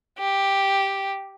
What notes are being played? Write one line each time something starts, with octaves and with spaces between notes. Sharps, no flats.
G4